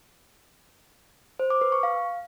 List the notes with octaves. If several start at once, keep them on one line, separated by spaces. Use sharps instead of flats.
C5
D6
B4
C#6
F5